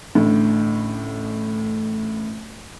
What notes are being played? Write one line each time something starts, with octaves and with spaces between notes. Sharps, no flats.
A1 A2 D3